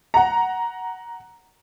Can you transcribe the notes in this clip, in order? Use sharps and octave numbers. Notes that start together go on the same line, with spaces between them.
F#5 A#5